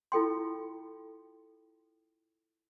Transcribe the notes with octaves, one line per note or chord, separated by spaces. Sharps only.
E4 F4 A4 G5 C6